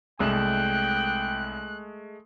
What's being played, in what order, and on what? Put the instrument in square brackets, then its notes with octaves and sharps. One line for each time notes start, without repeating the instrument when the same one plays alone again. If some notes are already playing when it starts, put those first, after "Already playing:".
[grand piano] C2 E7 [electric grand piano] G#3 A3 [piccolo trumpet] G5 [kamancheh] F#6